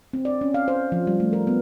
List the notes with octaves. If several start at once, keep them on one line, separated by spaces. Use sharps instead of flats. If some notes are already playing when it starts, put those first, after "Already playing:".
C4
D5
C#4
F5
C5
F3
G3
A3
A#4
B3